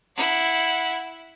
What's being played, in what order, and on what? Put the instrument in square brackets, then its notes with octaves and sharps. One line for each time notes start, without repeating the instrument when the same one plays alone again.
[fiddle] E4 F#5